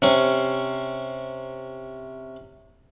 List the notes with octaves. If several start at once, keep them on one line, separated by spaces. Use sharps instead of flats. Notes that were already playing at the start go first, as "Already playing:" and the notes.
C3 C#4